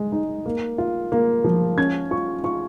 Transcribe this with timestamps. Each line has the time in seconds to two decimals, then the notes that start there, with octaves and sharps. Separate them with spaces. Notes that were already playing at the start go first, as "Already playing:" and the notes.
Already playing: G#3
0.12 D#4
0.46 A#3
0.78 F4
1.12 A#3
1.44 F3
1.78 C#4 G#6
2.11 F4 C#6
2.44 F4 C#6